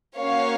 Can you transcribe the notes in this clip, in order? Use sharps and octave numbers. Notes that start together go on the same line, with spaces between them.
A#3 C#4 F#4 C#5 F5